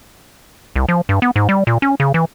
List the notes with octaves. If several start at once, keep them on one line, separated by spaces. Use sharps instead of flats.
C2
F3
G2
B3
G#2
G3
A#2
C#4
C#3
E3